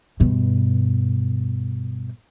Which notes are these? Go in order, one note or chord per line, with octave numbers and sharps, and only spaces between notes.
G2 B2